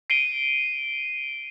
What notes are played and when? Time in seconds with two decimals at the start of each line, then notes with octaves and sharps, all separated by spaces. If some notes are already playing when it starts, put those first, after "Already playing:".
0.10 C7 D7 D#7 G7